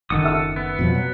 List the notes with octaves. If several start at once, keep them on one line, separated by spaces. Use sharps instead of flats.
F#1 D#3 A4 F#5 D#6
E5 E6
B3
F2 B2 F3
F#3